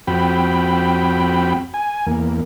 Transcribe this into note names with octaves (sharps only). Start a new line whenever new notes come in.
F2 C4 F#4 G5 B5
G#5
E2 A#3